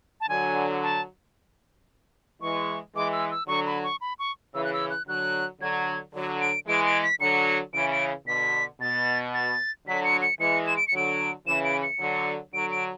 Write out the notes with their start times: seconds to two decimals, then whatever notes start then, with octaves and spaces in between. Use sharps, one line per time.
0.21 A5
0.29 D3 F#3 G#5
0.83 A5
2.41 E3 G#3 C#6
2.95 E3 G#3 D6
3.12 E6
3.31 E6
3.48 D3 F#3 C#6
3.66 B5
3.84 C#6
4.01 B5
4.19 C#6
4.55 C#3 E3 E6
4.64 F#6
4.73 E6
4.90 F#6
5.08 D3 F#3 F#6
5.61 D3 F#3 G#6
6.14 D3 F#3
6.41 D7
6.67 E3 G#3 D7
6.86 D7
7.03 B6
7.20 D3 F#3 C#7
7.74 C#3 E3 D7
7.92 D7
8.27 B2 D3 B6
8.81 B2 A6
9.34 A6
9.87 D3 F#3 B6
10.04 C#7
10.22 C#7
10.40 E3 G#3 C#7
10.67 E7
10.77 D7
10.88 C#7
10.93 D3 F#3 D7
11.47 C#3 E3 E7
11.65 D7
11.83 C#7
12.00 D3 F#3
12.54 D3 F#3 D7
12.72 D7